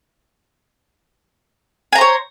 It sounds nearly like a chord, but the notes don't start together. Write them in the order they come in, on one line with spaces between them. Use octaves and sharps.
G#5 A#5 C5 C#5